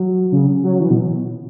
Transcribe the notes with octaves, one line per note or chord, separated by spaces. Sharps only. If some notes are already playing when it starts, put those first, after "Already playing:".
Already playing: F#3
C#3
F#3
E3
B2